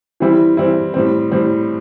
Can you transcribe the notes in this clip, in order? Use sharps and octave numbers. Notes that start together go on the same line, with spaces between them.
E3 G3 C4 E4
E3 G3 C4 E4
A2 G3 C4
A2 G3 C4